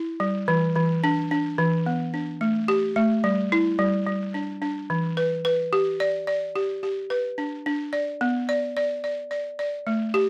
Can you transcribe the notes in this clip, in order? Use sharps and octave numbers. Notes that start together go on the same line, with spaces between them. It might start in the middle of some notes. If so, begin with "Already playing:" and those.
Already playing: E4
G3
E3
E3
D4
D4
E3
B3
D4
A3
G4
A3
G3
E4
G3
G3
D4
D4
E3
B4
B4
G4
D5
D5
G4
G4
B4
D4
D4
D5
B3
D5
D5
D5
D5
D5
A3
G4